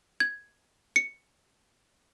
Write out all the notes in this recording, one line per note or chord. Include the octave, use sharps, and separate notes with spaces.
G#6
C#7